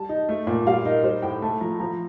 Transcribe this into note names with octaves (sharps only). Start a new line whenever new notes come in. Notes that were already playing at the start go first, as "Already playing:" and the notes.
Already playing: G3 A5
D#4
A3
A#2
G3 F5
D#4 A#4
G3 C5
A2 G5
A3 A5
F3 A#5
F3 A#5